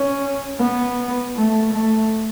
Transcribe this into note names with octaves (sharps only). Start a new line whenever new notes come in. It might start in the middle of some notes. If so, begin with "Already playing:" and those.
Already playing: C#4
B3
A3
A3